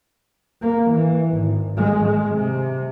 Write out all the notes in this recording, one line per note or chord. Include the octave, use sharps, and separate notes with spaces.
A#3
E3
G#1
G#3
G#3
C3